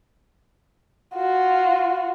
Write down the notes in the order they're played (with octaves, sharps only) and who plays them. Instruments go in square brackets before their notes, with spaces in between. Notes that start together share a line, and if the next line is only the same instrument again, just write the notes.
[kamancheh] F4 F#4